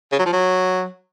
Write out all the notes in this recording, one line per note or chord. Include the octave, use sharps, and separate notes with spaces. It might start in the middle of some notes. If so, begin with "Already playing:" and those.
C#3
F#3
F3
F#3